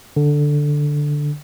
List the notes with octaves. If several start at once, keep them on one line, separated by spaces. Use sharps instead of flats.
D3